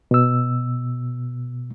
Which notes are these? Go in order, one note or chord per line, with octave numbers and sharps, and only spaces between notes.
B2 E6